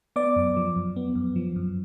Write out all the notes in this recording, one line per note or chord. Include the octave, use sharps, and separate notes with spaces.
B3 D5 D6
F#2
F3
F#2
B3
F#2
F3
F#2